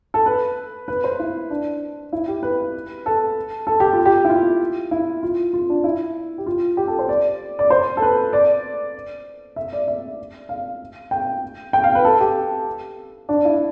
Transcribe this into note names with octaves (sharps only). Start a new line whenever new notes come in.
A4
B4
B4
C5
E4
D4
E4
G4
B4
A4
A4
G4
F4
G4
E4
F4
E4
F4
F4
D4
E4
G4
F4
G4
A4
C5
D5
D5
C5
A4
B4
D5
E5
D5
E5
F5
G5
G5
F5
B4
A4
G4
D4
E4